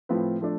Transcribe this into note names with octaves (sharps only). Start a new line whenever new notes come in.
A2 F3 C4 F4 B4
F3 A3 D4